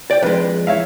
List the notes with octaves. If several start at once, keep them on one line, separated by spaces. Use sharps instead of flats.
D5 G5
F2 G#3 B4
C#5 E5 F5